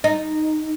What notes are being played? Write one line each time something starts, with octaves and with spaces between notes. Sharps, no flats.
D#4